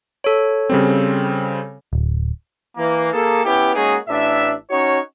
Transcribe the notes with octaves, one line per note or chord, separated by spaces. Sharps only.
A4 C#5
C#3 G3 C4
D1
E3 A#3
A#3 G#4 A4
B3 C#4 E4 G4
G#3 A#3 C#4 D#4 F#4 G#4
A1 A2 D4 E5
C#4 D#4 F#4 C#5